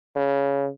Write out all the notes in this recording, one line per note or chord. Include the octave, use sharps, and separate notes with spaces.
C#3